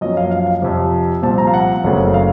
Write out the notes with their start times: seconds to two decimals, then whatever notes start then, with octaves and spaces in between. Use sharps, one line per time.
0.01 F#2 F3 A#3 C#4 D#5
0.17 F5
0.31 F5
0.47 F5
0.62 F2 C3 F3
1.22 C2 A#2 F3 C4 A5
1.38 A#5
1.47 F5
1.54 F#5
1.84 F#1 F#2 C#3 A3 C4
2.14 F5